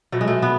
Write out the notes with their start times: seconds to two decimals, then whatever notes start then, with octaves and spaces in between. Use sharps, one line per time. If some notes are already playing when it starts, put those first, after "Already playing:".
0.12 B2 F#3 A3
0.21 G#3
0.28 A3
0.42 B3